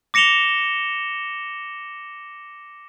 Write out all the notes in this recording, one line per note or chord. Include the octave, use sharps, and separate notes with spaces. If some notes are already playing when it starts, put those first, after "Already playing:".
D6 A#6 C#7 E7 F7 G7